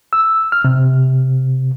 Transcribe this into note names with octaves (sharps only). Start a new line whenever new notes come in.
E6
F6
C3